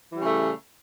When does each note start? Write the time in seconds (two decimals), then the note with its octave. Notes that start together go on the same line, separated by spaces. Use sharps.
0.11 E3
0.16 G3
0.21 C#3
0.26 A3